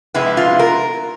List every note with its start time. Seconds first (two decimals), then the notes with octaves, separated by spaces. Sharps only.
0.14 C3 F3 G#3 B3 E4
0.37 F4
0.59 A#4